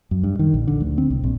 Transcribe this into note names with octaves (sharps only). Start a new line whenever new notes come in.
F#2
G2
D#3
A#1
D3
D2
C4
C2
A#1